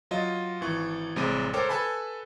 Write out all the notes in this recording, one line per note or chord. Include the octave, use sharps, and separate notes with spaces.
F#3 F4 D#5
G#1 E3 C#6
A1 C3 G3 G#3 D6 D#7
A4 A#4 C5 C#5 G5 D6
A4 B4 G#5 A5 B5